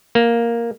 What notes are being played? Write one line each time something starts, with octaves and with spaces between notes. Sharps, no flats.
A#3